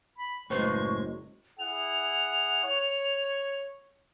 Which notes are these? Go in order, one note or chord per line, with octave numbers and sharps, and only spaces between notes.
B5
F#1 A2 G#3 B4 C5 C#6
E4 G#4 F#5 F7
C#5